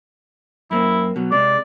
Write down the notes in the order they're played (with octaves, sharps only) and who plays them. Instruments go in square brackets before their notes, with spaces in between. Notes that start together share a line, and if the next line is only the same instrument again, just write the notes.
[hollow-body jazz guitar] F#2 A#3 C4 [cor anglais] E4
[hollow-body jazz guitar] B2 F#3
[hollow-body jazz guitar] C3 G#3 [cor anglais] D5